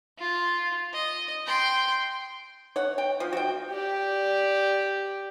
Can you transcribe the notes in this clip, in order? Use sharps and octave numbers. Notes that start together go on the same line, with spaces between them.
F4
D#5
G5 C6
C#5 F#5
G5
F3
F#4 G5
G4 D5